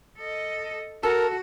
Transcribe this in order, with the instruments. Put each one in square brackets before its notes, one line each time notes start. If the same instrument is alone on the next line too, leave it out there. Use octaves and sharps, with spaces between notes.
[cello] A4 D#5
[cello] F#4 [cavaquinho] A4 [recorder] A#4 [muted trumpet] A5